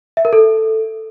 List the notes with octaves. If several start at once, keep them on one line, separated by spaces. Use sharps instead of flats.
E5
A#4
A4